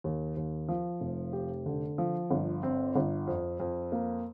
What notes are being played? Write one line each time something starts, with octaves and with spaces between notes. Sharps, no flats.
D#2
D#2
F3
F1
G4
D3
F3
G1
C4
G1
F2
F2
A#3